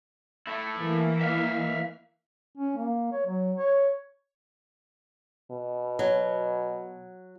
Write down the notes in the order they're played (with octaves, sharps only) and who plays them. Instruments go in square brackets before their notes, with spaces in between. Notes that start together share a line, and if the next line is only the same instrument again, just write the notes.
[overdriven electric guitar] A3 E4
[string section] E3 A#3
[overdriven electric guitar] E5 F5
[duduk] C#4
A#3
C#5
F#3
C#5
[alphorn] B2
[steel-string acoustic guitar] F#3